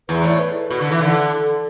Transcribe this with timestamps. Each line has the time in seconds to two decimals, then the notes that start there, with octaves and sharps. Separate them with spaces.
0.09 E2 B4
0.24 A2 D5
0.39 B4
0.70 B2
0.81 D3
0.91 E3
1.01 D3 A4